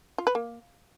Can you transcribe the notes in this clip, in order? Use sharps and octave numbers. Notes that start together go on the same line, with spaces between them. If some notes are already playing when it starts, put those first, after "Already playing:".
F4
B4
A#3